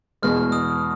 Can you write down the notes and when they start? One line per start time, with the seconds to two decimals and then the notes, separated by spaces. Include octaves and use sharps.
0.22 E2 B2 G#3 F6
0.52 D#6